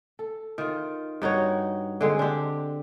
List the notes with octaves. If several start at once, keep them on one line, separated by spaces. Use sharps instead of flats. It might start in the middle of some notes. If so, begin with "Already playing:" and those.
A4
D#3 F4
G2 D#4 F#4 C#5
D3 G#3 C4
D4 G4